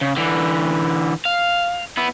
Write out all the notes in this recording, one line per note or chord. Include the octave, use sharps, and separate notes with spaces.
C#3
D3 E3
F5
B3 E4